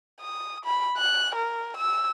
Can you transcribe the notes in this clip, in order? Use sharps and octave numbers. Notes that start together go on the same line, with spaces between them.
D#6
B5
F#6
A#4
E6